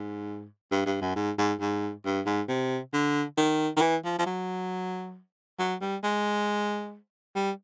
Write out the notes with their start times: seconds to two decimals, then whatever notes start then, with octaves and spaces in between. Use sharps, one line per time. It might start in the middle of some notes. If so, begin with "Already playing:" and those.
Already playing: G#2
0.71 G2
0.86 G2
1.02 F#2
1.16 G#2
1.38 G#2
1.60 G#2
2.05 G2
2.26 G#2
2.48 C3
2.93 D3
3.38 D#3
3.76 D#3
3.81 E3
4.04 F3
4.19 F3
4.26 F#3
5.59 F#3
5.81 G3
6.04 G#3
7.35 G3